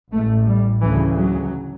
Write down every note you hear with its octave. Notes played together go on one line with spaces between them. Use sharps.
A1 A2 A3
G3
D2 C#3 E3
F#3